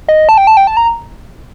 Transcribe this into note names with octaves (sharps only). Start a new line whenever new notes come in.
D#5
A5
G5
A5
G5
A5
A#5